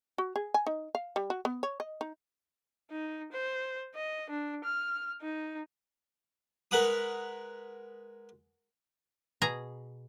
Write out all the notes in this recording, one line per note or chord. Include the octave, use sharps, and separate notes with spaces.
F#4
G#4
G#5
D#4
F5
G3
F#4
B3
C#5
D#5
D#4
D#4
C5
D#5
D4
F6
D#4
G#3 A#4 B4 F#5 B5 D#6
B2 G#4 A#5